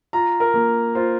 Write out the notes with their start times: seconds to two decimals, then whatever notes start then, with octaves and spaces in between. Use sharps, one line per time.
0.13 F4 A#5
0.40 A#4
0.54 A#3
0.95 F4 C5